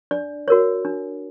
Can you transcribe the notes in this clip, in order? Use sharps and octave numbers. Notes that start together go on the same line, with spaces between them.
D4 D5
F#4 A#4 C#5
D4